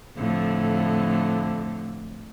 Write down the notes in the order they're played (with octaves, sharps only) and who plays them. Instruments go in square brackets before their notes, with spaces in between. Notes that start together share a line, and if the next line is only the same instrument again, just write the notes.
[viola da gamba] F2 A2 D3